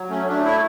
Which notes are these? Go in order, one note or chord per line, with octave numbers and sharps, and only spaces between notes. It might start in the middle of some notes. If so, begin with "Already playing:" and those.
Already playing: F#3
A3 C#4
A3 D4
E4